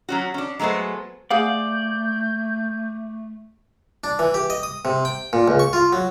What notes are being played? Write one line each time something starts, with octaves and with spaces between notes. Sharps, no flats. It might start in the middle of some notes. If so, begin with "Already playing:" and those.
F#3 C#4 F#4
C#4 D4
F#3 G#3 A3 B3 C5
A3 G#4 D5 F5 F#5 G6
D4
E3
G4
D#5
D#6
C3
G5
A#2
C#2
C#6
F4
F#3